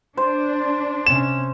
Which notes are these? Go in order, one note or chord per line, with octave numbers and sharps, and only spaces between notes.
D4 C5
C3 C#4 E7